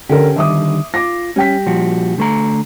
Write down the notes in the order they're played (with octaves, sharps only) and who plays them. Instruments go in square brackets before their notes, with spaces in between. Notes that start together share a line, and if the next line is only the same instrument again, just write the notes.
[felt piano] D3 A4 A#4 [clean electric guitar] C#4 G4
[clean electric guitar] D3 D#3 G3 [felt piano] E5 D6 D#6
[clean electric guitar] F4 [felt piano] D6 A#6
[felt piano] G3 G5 B6 [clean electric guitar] C#4
[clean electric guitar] A#2 F3 F#4
D3 A3 A#5